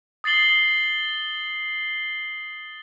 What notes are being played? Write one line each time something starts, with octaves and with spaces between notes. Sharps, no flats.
D#6 A6 C7 F#7 G7